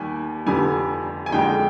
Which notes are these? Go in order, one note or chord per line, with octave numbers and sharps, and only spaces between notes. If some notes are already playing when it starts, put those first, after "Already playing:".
Already playing: D#2 D#3 G3 G#5
F1 F2 D3 G3 G#5
G#5
F2 D3 G#3 G5